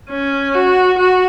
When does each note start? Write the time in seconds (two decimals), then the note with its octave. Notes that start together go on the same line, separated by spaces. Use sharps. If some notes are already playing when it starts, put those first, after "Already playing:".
0.10 C#4
0.54 F#4
0.99 F#4